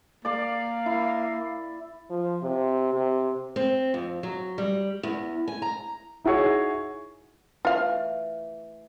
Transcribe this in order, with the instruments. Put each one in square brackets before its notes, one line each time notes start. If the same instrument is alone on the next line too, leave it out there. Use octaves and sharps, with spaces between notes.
[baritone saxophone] A#3 [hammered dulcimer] D5 D6 [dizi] F5
[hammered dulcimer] E4
[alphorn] F3
C3
C3
[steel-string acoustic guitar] C4
F2
F#3
G3
E2
G#5
A#5
[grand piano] D#4 E4 F#4 G#4 C#5
[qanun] E3 A3 [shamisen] F4 F5